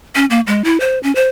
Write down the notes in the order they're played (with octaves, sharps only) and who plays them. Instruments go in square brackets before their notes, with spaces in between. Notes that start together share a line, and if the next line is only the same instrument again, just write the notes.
[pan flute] C#4
A#3
G#3
E4
C5
C#4
C5